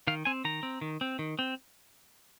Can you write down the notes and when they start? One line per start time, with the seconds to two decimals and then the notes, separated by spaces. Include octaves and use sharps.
0.07 D#3 F5
0.25 C4 G#5
0.45 D#3 A#5
0.63 C4
0.81 D#3
1.01 C4
1.19 D#3
1.39 C4